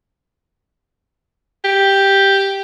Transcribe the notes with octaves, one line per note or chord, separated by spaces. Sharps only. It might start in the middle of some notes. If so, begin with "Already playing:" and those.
G4